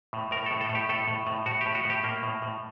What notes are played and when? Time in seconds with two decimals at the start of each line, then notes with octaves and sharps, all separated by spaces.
0.13 A2
0.31 A2 A#4
0.46 A4
0.51 A2
0.61 A4
0.69 A2
0.75 G4
0.89 A2 A4
1.08 A2
1.27 A2
1.46 A2 F#4
1.61 G4
1.66 A2
1.75 F#4
1.85 A2 G4
2.04 A2 A#3
2.23 A2
2.42 A2